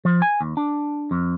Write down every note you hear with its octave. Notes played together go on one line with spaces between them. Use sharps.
F3
G#5
D#2
D4
F2